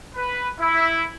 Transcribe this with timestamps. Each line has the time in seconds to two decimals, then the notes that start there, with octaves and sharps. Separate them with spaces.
0.15 B4
0.59 E4